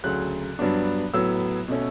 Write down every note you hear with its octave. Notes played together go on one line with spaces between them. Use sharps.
D2 C#3 F#3 F#6
G2 F#3 B3 D4
A2 F#3 B3 E6
B2 A3 C#4